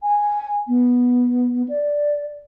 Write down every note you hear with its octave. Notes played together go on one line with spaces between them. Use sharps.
G#5
B3
D5